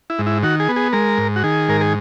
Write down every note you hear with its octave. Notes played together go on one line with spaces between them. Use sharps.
E4
G#2
E4
D#3 F#4
G#4
B3
G#4
G#3 A#4
G#2
F#4
D#3 G#4
G#2 A#4
G#4